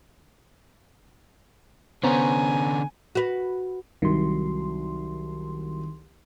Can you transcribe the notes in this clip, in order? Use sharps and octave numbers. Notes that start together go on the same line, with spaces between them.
D3 B3 C#4 C5 C#5 G#5 A#5
F#4 B4
C2 D#3 F#3 C6